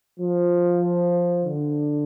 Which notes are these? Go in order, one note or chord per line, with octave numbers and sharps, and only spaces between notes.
F3
D3